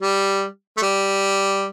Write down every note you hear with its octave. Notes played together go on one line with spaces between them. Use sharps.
G3
A3
G3